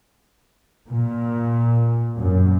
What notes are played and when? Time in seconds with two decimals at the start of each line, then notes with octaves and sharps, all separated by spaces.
0.89 A#2
2.18 F#2